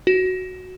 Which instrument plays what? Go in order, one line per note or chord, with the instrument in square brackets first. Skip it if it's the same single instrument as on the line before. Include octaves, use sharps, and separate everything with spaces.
[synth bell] F#4